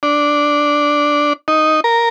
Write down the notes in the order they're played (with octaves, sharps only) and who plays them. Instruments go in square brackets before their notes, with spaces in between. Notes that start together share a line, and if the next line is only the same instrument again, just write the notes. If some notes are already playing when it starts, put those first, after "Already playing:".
[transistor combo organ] D4
D#4
A#4